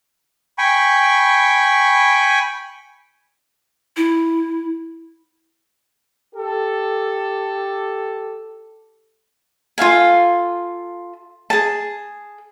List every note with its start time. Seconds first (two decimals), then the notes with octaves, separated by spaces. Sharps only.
0.58 G5 G#5 B5 C#6
3.96 E4
6.35 G4 A4
9.78 F4 A4 F5 G#5
11.50 G#4 A5